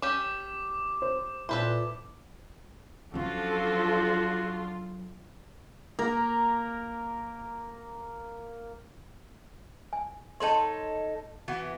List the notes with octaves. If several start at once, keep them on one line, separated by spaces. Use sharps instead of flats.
C#4 G4 D6
C5
A#2 E4 A4 B4 C5
F3 F#3 C#4 D4 F4 F#4 A4
A#3 A#4 A#5
G#5
D#4 A4 C#5 A5 C6
E3 B3 F#4